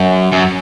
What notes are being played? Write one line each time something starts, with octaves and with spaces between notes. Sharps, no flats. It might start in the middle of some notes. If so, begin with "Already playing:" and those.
Already playing: F#2
F#2